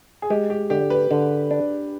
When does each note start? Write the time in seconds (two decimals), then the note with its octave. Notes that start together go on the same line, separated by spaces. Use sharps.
0.22 G#4
0.30 G#3 G4
0.50 G4
0.70 D3 G4
0.90 B4
1.11 D3
1.51 D4